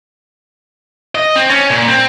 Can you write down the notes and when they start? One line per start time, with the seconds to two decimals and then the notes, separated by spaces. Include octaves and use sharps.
1.15 D#5
1.35 C4
1.50 C#4
1.70 A#2
1.88 C4